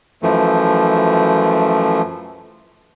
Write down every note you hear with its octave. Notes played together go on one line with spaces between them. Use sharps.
F#2 E3 F3 A3